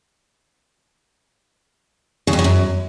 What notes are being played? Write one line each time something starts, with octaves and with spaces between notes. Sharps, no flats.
C#3
F2
C#3
F#2